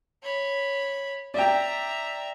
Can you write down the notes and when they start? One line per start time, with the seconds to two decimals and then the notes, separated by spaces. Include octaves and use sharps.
0.23 C#5 B5
1.34 D5 E5 G5 A#5